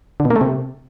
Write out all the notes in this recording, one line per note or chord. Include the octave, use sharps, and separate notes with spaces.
D3
B2
A#3
A3
C3